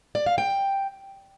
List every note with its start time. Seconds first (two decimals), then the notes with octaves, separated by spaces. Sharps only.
0.15 D5
0.26 F5
0.38 G5